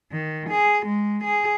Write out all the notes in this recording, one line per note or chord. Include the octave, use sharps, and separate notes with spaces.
D#3
G#4
G#3
G#4